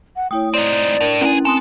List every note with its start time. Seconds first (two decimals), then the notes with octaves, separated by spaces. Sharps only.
0.16 F#5
0.31 A3 E4 C#5 G5 D#6
0.54 C4 D#4 D5
1.01 A2 D4 A#4
1.21 A#3 C#4 E4 G#4
1.45 C4 A4 G#5 C6 D#6